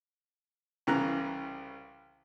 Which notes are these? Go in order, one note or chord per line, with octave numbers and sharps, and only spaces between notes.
C2 C#3 E3 A#5 F#6